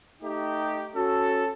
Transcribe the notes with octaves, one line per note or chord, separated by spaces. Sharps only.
A3 D#4 G4
C#4 F#4 A4